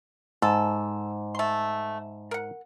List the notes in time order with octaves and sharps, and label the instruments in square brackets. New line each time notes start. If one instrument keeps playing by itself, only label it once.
[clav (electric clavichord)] G#2 [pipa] A4
[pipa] A3 C6
A#4 F#5